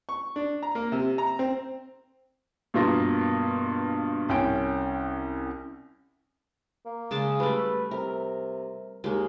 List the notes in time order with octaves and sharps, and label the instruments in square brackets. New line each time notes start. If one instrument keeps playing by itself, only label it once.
[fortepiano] C#6
D4
A#5
A#3
C3
A#5
C4
[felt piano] G2 B2 A#3 F4 A#4 A#6
C2 C#4 G5 D7
[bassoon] A#3
[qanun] C#3 G#3 A5
[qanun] G3 A3 [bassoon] B4
[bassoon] C3 [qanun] A#4
[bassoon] D#2 [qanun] G#3 A#3